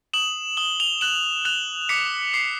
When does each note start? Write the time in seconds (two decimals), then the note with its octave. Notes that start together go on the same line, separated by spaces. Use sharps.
0.13 D#6 E7 F#7
0.57 D#6 G7
0.80 F7 G7
1.01 F#6 E7 F#7
1.45 F#6 F7 G7
1.89 D6 B6 C#7
2.34 D6 C7